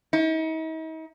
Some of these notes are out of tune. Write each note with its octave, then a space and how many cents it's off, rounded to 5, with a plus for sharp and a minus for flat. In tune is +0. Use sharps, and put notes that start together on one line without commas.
D#4 +45